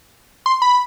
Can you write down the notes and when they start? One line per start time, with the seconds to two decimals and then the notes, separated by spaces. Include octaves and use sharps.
0.46 C6
0.62 B5